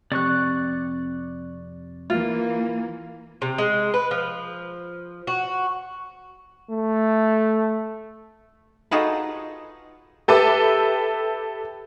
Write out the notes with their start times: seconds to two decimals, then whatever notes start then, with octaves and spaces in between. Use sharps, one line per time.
0.12 F2 C3 D5 C#6 F#6
2.10 E3 A#3 F4
3.42 C3
3.58 G#3
3.94 B4
4.11 F3
5.27 F#4
6.70 A3
8.91 D#4 F4 F#4 G#4 A4 B4
10.28 G4 A4 B4 E5 D6